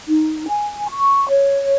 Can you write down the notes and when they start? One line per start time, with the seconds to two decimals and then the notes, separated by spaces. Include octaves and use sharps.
0.08 D#4
0.49 G#5
0.89 C#6
1.29 C#5